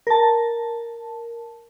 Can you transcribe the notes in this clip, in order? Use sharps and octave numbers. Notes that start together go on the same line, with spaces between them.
A#4 A5